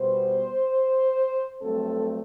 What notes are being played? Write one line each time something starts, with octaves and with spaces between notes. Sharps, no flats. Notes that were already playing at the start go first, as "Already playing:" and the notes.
Already playing: B2 G3 B3 C5
G2 F#3 A3 C4 A4